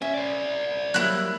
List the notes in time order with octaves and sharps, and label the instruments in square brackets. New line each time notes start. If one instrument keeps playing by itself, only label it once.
[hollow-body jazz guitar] C#4 [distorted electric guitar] D#5 E5
[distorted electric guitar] C5 D5
[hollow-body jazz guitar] F#3 G3 A#3 [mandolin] E4 F#6